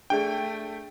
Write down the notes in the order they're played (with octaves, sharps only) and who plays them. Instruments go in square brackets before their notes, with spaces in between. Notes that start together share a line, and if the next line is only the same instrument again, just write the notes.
[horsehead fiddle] A3 [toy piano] D4 G#4 D5 [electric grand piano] G5